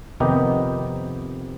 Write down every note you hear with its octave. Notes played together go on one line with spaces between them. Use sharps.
F2 C3 D#3 B3 D#4 G4